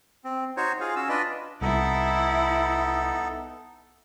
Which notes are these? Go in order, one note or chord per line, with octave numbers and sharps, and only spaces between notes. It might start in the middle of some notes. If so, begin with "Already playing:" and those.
C4
D#4 F#4 C5 C#5
F4 G#4 F5
C#4 F#4 E6
D4 F4 B4 D5 D#5
C2 B3 D#4 E4 A4